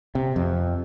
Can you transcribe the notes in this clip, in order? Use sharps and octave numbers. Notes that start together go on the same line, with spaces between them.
C3
F2